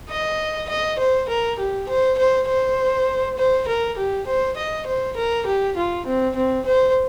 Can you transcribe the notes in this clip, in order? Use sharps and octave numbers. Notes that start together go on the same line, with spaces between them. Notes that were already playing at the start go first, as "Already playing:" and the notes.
D#5
D#5
C5
A#4
G4
C5
C5
C5
C5
A#4
G4
C5
D#5
C5
A#4
G4
F4
C4
C4
C5